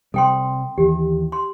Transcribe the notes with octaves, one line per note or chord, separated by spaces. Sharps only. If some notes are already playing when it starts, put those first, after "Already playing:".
C3 G3 C4 A4 G5 C6
D#2 E3 G4
C6